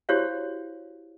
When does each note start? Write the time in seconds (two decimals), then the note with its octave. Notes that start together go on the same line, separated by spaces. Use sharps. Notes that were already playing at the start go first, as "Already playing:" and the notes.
0.09 E4 F#4 G4 C5 C#5 F5